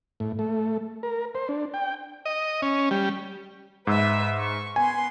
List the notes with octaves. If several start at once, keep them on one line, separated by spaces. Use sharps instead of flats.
A2
A3
A#4
C5
D4
G5
D#5
C#4
G3
G#2 B4 E5 E6
C#6
B3 G#5 C6